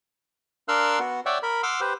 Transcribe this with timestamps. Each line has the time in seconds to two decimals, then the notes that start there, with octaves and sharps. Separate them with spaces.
0.68 D4 A#4 F5 C6 E6 F#6
0.99 B3 F#4
1.26 C#5 D5 E5 F#5 G5
1.43 A#4 B5
1.63 F#5 C6 D6 E6 F6
1.81 G4 B4 C5